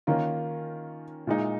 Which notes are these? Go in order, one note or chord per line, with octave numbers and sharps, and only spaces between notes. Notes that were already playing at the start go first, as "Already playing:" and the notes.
D#3 A#3 C#4 F4 A#4
A#2 G#3 D#4